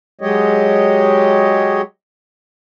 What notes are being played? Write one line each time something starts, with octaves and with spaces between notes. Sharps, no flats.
F#3 G#3 G4 C#5 D#5